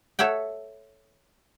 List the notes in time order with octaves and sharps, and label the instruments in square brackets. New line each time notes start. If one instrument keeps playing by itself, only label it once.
[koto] A4 C#5 E5 F#5 G5